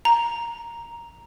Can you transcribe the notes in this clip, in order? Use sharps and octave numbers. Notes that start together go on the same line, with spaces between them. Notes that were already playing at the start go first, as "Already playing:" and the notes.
A#5